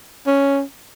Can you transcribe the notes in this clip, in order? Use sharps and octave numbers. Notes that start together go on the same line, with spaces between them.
C#4